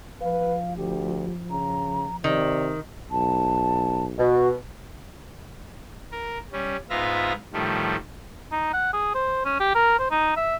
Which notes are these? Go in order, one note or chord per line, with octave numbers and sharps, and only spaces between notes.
F3 B4 F5
D2 G4
C#3 A#5
C3 D#3 D5
B1 A5
B2 F#4
A#4
G3 C#4
G#2 B3 F4 E5 F5 A#6
A2 D#3 F3 G3 A3
D#4
F#5
G#4
C5
C#4
G4
A#4
C5
D#4
E5